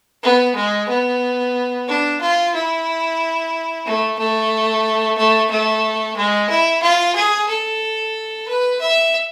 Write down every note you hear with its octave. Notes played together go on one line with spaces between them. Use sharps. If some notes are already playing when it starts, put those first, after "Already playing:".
B3
G#3
B3
D4
F4
E4
A3
A3
A3
A3
G#3
E4
F4
G#4
A4
B4
E5